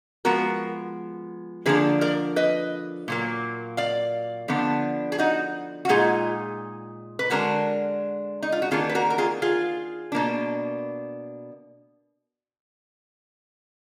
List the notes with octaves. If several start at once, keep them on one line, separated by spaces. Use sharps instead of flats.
F3 G#3 B3 F#4 A#4
D3 F3 A#3 D4 G#4 B4
A#4 D5
B4 D#5
A#2 F#3 A#3
D5 F5
D3 F3 B3 D4
G#4
D#4 F#4
F#4
A#2 G#3 D#4 F4 G#4
B4
D3 G#3 D4 F#4 A#4
D#4
F4
F#4
D#3 A#3 D4 F4 G#4
B4
F#4 A#4
A#4
F4 G#4
F4 G#4
B2 A#3 D4